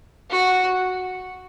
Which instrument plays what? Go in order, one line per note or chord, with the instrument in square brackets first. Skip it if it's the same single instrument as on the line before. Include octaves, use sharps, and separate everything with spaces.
[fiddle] F#4